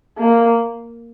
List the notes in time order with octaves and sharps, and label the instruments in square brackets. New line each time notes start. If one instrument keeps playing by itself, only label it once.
[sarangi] A#3